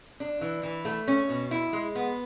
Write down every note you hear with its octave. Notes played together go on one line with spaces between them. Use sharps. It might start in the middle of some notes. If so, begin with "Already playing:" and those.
D4
E3
E3
A3
C#4
B2
E4
G#3
B3